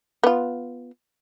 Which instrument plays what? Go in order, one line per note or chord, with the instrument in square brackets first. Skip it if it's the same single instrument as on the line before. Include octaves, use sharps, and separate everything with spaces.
[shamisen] B3 F4